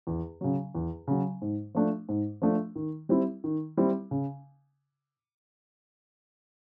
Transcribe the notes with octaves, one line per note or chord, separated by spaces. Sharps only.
E2
C#3 F#3
E2
C#3 F#3
G#2
F3 A3 D4
G#2
F3 A3 D4
D#3
G3 C4 E4
D#3
G3 C4 E4
C#3